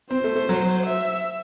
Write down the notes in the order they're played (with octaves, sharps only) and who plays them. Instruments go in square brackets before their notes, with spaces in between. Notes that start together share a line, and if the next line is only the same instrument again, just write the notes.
[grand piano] C4 [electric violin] C5
[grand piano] A3
A3
F#3
[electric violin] E5